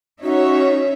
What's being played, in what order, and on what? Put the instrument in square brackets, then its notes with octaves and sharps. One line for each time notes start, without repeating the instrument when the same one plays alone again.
[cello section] C#4 D#4 [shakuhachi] F#4 [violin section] C#5 E5